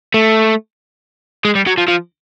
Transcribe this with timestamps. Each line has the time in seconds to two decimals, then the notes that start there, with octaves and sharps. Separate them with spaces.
0.14 A3
1.45 G#3
1.55 G3
1.67 F#3
1.78 F3
1.88 F3